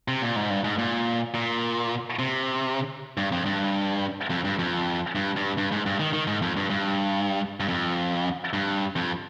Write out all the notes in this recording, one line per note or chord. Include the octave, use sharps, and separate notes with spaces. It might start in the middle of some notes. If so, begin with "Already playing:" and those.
C3
A#2
G#2
G2
G#2
A#2
A#2
C3
G2
F2
G2
F2
G2
F2
G2
G2
G2
G#2
G2
D#3
D#3
G#2
F2
G2
G2
G2
F2
G2
F2